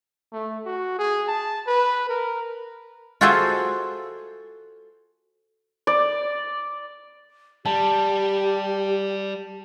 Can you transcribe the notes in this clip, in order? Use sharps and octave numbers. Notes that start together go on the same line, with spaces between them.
A3
F#4
G#4
A5
B4
A#4
F4 F#4 G#4 A4 C5 E5
D5
G3 G4 A5